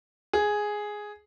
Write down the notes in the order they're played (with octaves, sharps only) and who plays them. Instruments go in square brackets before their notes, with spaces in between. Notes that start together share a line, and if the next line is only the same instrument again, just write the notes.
[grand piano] G#4